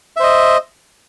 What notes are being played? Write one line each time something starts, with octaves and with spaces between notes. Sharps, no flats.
C5 D#5 E5